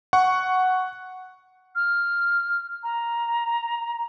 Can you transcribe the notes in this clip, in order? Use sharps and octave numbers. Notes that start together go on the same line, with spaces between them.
F#5 C#6
F6
A#5